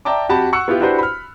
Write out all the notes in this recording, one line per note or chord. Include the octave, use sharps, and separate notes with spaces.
D5 E5 G5 A5 A#5 D6
F2 F#4 G4 A5 B5
F#5 C#6 E6 F#6 C#7
B3 E4 F4 G4
D4 E4 F#4 G4 B4 C5
B5 F6